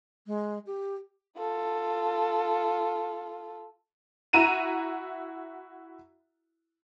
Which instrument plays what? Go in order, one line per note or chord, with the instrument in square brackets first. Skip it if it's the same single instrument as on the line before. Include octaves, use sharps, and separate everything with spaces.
[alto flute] G#3
G4
[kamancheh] F4 A4
[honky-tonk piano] E4 F#4 A#5 D#7 E7